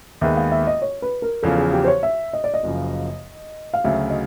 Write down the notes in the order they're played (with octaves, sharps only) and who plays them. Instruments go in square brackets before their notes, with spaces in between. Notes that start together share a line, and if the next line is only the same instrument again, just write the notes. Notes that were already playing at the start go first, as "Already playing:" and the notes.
[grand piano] D#2 D#3 G#3 B3 [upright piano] E5
[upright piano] F5
E5
D#5
C#5
B4
A#4
[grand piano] E2 C#3 F3 [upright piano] A4
[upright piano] G#4
G4
C5
C#5
E5
D#5
D5
D#5
[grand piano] F#1 F#2 C#3 F3
[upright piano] F5
[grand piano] D2 C#3 F#3 [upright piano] E5
[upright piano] D#5